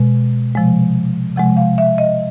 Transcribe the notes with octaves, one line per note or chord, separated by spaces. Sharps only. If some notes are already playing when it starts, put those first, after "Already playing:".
Already playing: B2 G#3
C3 F3 G#3
C3 F3 G#3 F#5
F5
E5
D#5